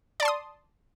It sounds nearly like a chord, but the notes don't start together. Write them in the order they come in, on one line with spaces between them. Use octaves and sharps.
D5 A5 C6 D#6